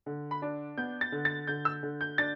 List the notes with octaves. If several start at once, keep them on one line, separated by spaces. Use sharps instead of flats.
D3
B5
D4
B3 G6
A6
D3
A6
D3 G6
E6
D3
G6
D4 A6